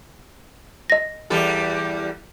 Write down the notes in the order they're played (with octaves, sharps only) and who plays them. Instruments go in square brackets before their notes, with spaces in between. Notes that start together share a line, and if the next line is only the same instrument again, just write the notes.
[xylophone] D#5 A#6
[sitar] E2 G3 A4